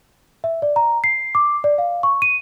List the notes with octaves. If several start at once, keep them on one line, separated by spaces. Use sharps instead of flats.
E5
D5
A#5
C7
D6
D5
F5
C#6
D#7